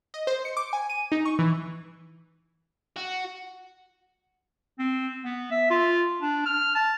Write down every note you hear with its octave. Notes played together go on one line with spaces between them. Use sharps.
D#5
C5
C#7
D6
G#5
D#7
D#4
C#6
E3
F#4
C4
B3
E5
F4
D4
F6
A5